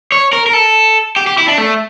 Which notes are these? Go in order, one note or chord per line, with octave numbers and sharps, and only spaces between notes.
C#5
A#4
A#4
A4
G4
G4
E4
D4
A3